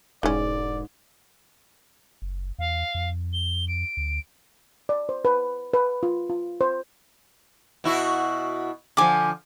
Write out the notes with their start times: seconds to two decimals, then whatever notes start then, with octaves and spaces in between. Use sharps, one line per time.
0.23 E1 G#2 E3 C#4 G#4 D5
2.22 F#1
2.59 E2 F5
2.95 F2
3.33 G7
3.68 D7
3.97 D2
4.89 D5
5.09 C5
5.25 B4
5.74 B4
6.03 F4
6.30 F4
6.61 C5
7.84 B2 E4 F#4
8.97 D3 F3 G#5 D6